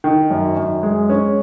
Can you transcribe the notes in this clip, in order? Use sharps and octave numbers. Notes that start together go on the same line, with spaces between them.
D#3
F#2
F#2
G#3
C#4